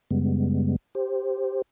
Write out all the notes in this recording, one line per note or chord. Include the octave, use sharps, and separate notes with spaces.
F#2 C#3 G3 G#3 B3
G4 C5